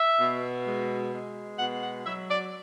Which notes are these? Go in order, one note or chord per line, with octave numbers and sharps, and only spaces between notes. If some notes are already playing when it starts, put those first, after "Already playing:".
Already playing: E5
B2
G#3
G#3
B2 F#5
F#5
F#3 E5
D5